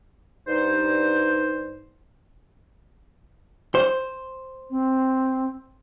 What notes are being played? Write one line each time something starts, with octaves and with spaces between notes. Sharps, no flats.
G2 D#4 C5
C5
C4